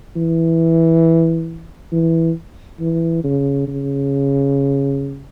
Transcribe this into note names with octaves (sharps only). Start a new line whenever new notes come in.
E3
E3
E3
C#3
C#3